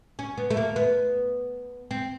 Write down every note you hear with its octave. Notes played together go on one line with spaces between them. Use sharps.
C#4
B3
A3
A#3
B3
C4